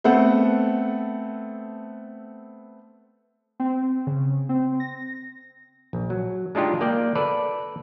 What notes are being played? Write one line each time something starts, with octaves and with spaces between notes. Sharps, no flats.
A3 B3 C4 A4 F#5
C4
C#3
C4
A#6
A#1
F#3
G#3 D4 D#4 F4 G4
A#3 D5 G5
A4 B4 D5